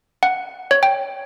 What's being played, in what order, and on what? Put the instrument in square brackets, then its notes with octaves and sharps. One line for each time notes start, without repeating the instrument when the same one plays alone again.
[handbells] F#5
C#5
G5